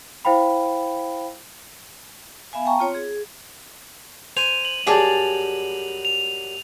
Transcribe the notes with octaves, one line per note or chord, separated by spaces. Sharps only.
E4 C5 F5 G5 B5
B3 E5 F5 G#5
G5 A5 A#5 C#6
C4 F4 C#5
G#4
C5 G#5 D#7 F7
F#7
F#2 G3 G#4 D5 A5
F7